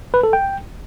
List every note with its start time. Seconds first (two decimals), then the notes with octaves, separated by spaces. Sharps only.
0.14 B4
0.23 A4
0.33 G5